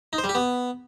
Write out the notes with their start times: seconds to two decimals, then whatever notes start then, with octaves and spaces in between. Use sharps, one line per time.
0.13 D#4
0.18 C5
0.24 G3
0.29 G4
0.35 B3